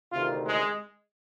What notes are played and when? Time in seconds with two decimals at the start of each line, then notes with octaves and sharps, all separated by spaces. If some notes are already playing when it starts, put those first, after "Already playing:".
0.11 D2 C3 D#3 F4
0.45 G#3